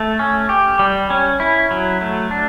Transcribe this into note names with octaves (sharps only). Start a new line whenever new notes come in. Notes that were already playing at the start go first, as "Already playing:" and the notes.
Already playing: A3
C#4
G4
G3
C#4
E4
F#3
A3
D4